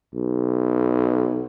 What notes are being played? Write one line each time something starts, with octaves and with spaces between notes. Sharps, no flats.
B1